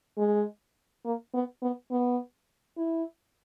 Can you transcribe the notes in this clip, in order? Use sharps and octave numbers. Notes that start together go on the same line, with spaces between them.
G#3
A#3
B3
B3
B3
E4